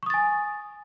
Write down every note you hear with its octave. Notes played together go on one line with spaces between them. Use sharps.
G#5 C#6 D#6 A6